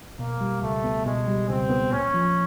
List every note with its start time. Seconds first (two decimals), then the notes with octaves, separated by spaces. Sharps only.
0.19 B2 A#3
0.41 G3
0.62 C#2 A3
0.84 B3
1.05 B2 G#3
1.28 G3
1.49 C#2 C4
1.70 B3
1.92 A#2 C#4
2.14 F3